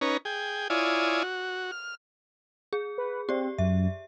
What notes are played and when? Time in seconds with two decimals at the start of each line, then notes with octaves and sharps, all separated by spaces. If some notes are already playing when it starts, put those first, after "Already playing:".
0.01 C#4 D#4 B4 C#5 A#5
0.25 G#4 G5
0.70 E4 F4 C#5 D5 G#5 D#6
1.23 F#4
1.72 F6
2.73 G#4
2.98 B4
3.29 C4 G4 D5
3.58 F#2 E5